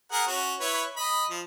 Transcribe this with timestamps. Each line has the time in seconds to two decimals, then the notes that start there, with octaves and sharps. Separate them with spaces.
0.12 G#4 A#4 F#5
0.27 C#4 F#4
0.60 E4 B4 C#5
0.97 D#5 B5
1.30 F3